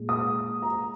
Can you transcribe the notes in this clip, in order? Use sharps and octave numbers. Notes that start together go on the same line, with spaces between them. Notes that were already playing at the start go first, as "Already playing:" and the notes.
Already playing: A#2 G#3
D#6
A#5